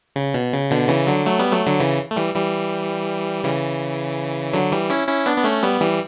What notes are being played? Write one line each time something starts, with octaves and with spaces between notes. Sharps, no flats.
C#3
B2
C#3
B2 D3
C#3 E3
D3 F#3
F#3 A3
G3 B3
F#3 A3
D3 F#3
C#3 E3
A3
E3 G3
E3 G3
C#3 E3
D3 F#3
E3 G3
C#4 E4
C#4 E4
B3 D4
B3
A3 C#4
G3 B3
E3 G3